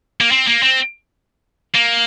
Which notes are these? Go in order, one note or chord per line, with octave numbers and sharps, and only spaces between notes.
A#3
C4
A#3
C4
A#3